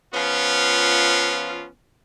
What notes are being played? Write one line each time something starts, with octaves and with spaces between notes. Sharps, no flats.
F3 B3 C#4 F4